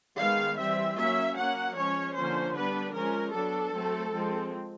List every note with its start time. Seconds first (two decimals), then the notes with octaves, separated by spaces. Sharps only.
0.19 D#3 G#3 B3 F5
0.58 E3 G3 C4 E5
0.98 F#3 A#3 C#4 E5
1.37 F#3 A#3 C#4 F#5
1.76 F3 G#3 C#4 C#5
2.16 D3 F3 A#3 C#4 C5
2.55 G3 B3 D4 B4
2.94 F3 G#3 C#4 A#4
3.33 F#3 B3 D4 A4
3.74 F#3 A3 C4
4.13 F3 G#3 C4